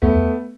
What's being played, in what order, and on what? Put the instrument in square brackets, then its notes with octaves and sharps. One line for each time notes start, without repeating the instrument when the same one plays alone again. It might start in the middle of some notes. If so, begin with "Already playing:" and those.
[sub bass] E2 [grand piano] A3 B3